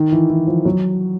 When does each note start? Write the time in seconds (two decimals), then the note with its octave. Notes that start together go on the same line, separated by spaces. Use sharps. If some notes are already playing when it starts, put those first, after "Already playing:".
Already playing: D#3
0.12 E3
0.30 E3
0.47 F3
0.65 F#3